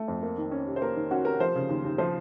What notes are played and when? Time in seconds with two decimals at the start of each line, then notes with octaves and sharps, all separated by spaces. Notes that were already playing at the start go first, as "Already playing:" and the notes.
Already playing: A3
0.08 F2
0.23 A#3
0.38 D#3
0.52 C#4
0.67 C3
0.76 C5
0.82 A#3 A#4
0.96 D#3
1.11 C#4 F#4
1.25 C3 A#4
1.40 F3 C5
1.55 C#3
1.69 D#2
1.84 D#2
1.98 F3 C5